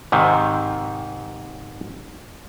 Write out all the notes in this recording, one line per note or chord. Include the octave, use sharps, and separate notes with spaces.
G#2 C3 D#3